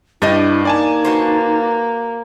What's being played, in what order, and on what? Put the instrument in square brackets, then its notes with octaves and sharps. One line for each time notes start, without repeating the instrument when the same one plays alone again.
[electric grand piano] G2 [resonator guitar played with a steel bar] D4 G4 D#5 [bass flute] E4
[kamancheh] A#3 [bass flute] D#4 [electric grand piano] D5 G#5 A5
[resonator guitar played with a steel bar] F#4 B4 C5